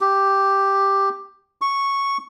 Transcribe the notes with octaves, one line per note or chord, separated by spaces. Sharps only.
G4
C#6